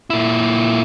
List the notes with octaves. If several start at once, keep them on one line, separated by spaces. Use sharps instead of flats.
A#2 E4